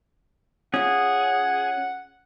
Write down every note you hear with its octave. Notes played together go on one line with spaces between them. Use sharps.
C#4 F4 G#4 F#5